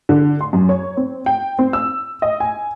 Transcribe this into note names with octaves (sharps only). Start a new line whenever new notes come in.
D3
C6
F#2
C#5
C4
G5
C4
E6
D#5
G#5